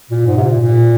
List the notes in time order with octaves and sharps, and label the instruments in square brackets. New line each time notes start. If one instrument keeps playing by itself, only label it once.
[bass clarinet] A#2
G#2
C3
A#2
A#2